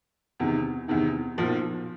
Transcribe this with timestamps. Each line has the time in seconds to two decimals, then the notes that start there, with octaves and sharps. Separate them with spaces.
0.40 E2 C3 D#3
0.88 E2 C3 D#3
1.38 B1 A#2 F3